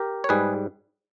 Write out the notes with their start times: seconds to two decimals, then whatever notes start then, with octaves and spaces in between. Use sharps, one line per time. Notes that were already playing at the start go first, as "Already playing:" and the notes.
Already playing: G4 A#4
0.24 C#5
0.29 G#2 G3 G#4 B4